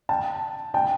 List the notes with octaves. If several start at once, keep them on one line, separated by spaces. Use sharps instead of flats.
G5 A5
G5 A5